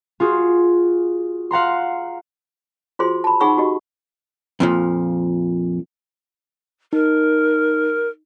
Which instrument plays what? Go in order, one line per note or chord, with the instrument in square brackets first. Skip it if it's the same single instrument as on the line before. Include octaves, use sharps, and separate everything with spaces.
[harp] F4 F#4 G#4
F5 F#5 A#5 C6
[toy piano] F4 F#4 G#4 C5 C6
A5 B5
D#4 G#4 F#5 B5 C#6 E6
F#4 G4 D#5
[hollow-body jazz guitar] F2 A#2 F3
[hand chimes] D#4 [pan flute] A#4